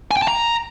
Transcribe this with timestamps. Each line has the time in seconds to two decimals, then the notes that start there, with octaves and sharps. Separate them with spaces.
0.11 G#5
0.17 G5
0.22 A5
0.28 A#5